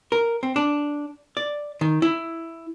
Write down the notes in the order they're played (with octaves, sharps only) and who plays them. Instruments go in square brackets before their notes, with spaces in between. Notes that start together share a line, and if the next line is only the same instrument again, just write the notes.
[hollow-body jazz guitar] A#4
C4
D4
D5
D#3
E4